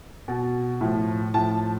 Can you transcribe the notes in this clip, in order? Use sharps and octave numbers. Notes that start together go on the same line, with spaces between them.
B2
A2 F3
A2 F3 A5